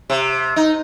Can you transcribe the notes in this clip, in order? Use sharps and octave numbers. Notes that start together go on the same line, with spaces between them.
C3
D#4